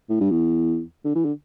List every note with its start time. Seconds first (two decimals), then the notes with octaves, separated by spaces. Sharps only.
0.09 A2
0.20 G2
0.30 E2
1.04 D3
1.15 E3
1.25 D3